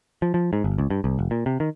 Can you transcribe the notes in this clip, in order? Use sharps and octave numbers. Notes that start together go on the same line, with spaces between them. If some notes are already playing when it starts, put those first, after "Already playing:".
F3
F3
G#2
G1
C#2
G2
C2
F1
A#2
C3
D#3